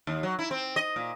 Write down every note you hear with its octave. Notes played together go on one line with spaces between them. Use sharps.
D#2
F#3
E4
C4
D#5
A#2